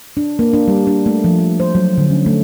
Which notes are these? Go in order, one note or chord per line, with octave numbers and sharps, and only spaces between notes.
D4
A#3
D4
G3
D4
A3
F3
C5
F#3
D3
C#4
A3